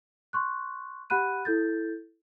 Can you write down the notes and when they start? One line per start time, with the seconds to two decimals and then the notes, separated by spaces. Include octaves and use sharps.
0.33 C6 C#6 F#6
1.10 G4 F#5 B5 F#6 D#7
1.45 E4 A4 G6 A6